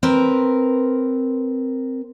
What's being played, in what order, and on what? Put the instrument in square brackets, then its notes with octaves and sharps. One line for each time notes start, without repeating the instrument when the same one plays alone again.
[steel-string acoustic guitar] C4 A#4 B4